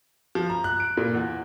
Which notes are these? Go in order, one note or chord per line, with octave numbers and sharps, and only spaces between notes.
F3
A#5
F#6
D7
A#2
E2